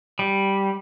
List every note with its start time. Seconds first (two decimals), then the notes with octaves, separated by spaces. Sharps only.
0.19 G3